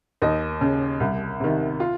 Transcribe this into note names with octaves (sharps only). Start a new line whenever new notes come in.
D#2 D#5
C#3
C2
C3 D#3
F4